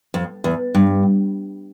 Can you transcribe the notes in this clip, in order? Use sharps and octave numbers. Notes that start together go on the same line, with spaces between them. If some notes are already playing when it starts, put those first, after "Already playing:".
F2
E2
G2